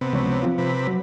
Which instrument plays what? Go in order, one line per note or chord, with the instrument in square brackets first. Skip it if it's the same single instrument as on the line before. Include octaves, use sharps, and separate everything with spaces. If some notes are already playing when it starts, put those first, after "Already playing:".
[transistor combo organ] C3 B3
[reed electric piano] C#2 F3 C#5
F3 C4 F4
[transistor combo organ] C3 B4
[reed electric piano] F#3